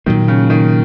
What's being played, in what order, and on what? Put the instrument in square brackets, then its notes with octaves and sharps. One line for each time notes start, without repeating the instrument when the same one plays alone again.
[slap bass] A#2 F#3 A#3 [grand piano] D#3
[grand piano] C#3
D#3